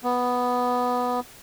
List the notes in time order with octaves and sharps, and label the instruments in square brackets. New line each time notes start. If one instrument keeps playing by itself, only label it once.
[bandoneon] B3